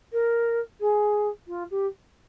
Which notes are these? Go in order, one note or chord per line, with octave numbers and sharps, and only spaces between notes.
A#4
G#4
F4
G4